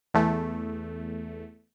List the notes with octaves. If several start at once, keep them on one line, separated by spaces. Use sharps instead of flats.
E2 A3